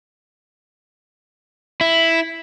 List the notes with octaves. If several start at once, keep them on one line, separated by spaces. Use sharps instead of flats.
E4